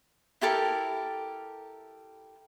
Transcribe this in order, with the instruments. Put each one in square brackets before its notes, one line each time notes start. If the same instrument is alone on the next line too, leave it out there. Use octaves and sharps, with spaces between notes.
[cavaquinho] E4 G4 A4 A#4